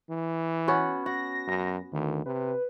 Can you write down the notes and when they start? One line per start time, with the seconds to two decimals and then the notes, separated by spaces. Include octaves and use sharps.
0.10 E3
0.68 B3 C#4 F#4
1.06 F#4 A#6
1.48 F#2
1.92 D2 D#3
2.26 C3 B4